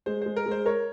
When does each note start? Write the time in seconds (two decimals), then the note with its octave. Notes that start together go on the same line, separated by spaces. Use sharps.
0.06 G#3 C5
0.22 G#3 C5
0.36 A#4
0.46 G#3
0.51 C5
0.66 A#4 C#5